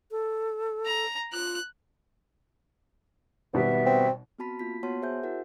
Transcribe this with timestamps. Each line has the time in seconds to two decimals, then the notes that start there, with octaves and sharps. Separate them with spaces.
0.11 A4
0.86 A#5
1.33 F4 F#6
3.54 G#1 B2 G3 B3 E5
3.86 C4
4.39 B3 C4 F#4 A5 B5 B6
4.59 A#3 F4 B6
4.83 B3 F#4 C#5 F#5 A5 C6
5.02 G#4 C5 E5 G#5 G6
5.23 E4 F#4 A#4 F#5